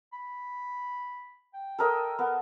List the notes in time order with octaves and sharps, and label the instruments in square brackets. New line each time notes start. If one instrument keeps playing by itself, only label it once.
[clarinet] B5
G5
[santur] A4 A#4 D#5
[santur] B3 [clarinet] A#4